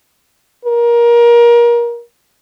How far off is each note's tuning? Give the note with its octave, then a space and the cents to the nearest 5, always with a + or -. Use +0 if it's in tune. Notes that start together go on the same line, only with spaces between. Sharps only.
A#4 +25